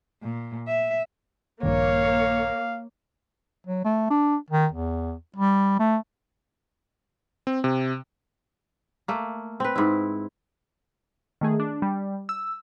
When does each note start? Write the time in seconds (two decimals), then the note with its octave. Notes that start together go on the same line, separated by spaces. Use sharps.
0.22 A#2
0.67 E5
1.63 A#1 G2 D#3 A#3 C#5 F5
3.66 F#3
3.85 A3
4.10 D4
4.50 D#3
4.72 E2
5.36 G3
5.79 A3
7.47 C4
7.64 C3
9.08 A3 A#3
9.60 C4 B4
9.76 G#2 E4
11.41 D#3 A3 G#4
11.60 D4
11.82 G3
12.29 E6